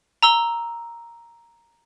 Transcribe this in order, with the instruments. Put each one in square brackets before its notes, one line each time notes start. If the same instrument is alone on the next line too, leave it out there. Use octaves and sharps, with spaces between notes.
[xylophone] A#5 E6 G7